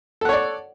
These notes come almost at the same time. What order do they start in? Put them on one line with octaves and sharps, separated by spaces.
A4 F#5 C#5 D5